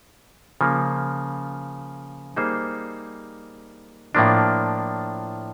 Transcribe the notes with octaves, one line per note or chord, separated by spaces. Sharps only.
C#3 F3 A#3
G3 A#3 D#4 G#4 C5
A2 F3 A#3 D4